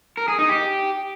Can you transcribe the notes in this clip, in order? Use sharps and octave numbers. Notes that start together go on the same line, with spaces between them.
A#4
G#4
D#4
G4